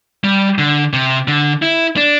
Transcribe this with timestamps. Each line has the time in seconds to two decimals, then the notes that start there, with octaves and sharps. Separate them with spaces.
0.24 G3
0.58 D3
0.93 C3
1.28 D3
1.62 E4
1.97 D4